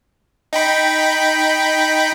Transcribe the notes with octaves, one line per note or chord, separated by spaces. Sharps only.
D#4 G5 B5